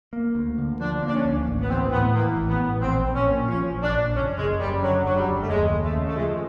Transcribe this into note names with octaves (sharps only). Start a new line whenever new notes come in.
A#3
D2
D3
F3 D4
A#3 D4
C#4
D2
A1
B3
A1 C4
A2 B3
E3 A#3
A1
B3
A1
A#1 C4
A#1
C#4
A#2
F3 C#4
A#1
D4
A#1
F#1 C#4
F#1 G#3
F#2 G3
D3 F#3
F#1 F#3
G3
F#1
A3
D#2 G#3
D#2
A3
C#3
A3
F3 G#3